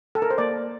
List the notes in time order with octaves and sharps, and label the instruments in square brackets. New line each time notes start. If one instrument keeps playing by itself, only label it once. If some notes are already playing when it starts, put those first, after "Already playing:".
[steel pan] A4
A#4
C5
A#3 D5